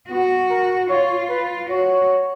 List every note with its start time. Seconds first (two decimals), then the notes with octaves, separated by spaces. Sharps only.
0.10 B3 F#4
0.50 A#4
0.89 F4 C#5
1.30 B4
1.69 F#4 C#5